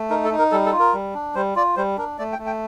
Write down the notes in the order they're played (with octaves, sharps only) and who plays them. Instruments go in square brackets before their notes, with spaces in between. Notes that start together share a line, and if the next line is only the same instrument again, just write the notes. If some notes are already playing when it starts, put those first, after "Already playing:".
Already playing: [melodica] A3
D#4 A#4
A4
D#4
A#4
G3 A4
A4
F4
A#4
G3
D4
G3 C5
F4 D5
G3 C5
D4 A#4
A3 D5
G5
A3
G5